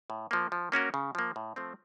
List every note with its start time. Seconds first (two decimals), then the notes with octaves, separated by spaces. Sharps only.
0.10 A2
0.31 F3 A#3
0.52 F3
0.72 A#3 C#4 F#4 A#4
0.94 C#3
1.15 F3 A#3
1.36 A2
1.56 F3 A3 C4